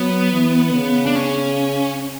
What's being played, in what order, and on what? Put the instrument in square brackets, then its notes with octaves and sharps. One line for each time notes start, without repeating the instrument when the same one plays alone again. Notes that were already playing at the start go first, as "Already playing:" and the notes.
Already playing: [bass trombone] F#3 [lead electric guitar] B3
[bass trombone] E3
C#3
[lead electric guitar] D4
C#4